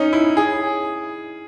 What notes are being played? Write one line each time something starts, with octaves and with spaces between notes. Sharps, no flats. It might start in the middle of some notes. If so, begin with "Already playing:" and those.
Already playing: C#4 D#4
E4
G#4